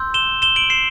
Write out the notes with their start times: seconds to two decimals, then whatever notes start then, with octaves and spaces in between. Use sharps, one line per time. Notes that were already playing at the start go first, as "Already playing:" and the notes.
Already playing: C6 E6 G6
0.14 E7 G7
0.42 E7 G7
0.56 D7 F#7
0.70 C7 E7